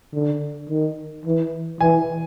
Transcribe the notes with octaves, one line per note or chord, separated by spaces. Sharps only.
D3
D#3
E3
E3 G#5